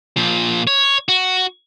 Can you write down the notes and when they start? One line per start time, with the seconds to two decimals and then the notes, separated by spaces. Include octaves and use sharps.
0.17 A#2 F3
0.67 C#5
1.09 F#4